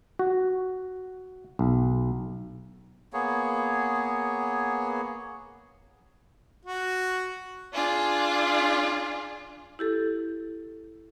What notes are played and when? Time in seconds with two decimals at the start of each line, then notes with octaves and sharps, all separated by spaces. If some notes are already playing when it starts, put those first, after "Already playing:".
0.19 F#4
1.59 B1
3.13 A#3 B3 G#4 C#5
6.65 F#4
7.72 D4 F4 G#4
9.79 E4 G4 A4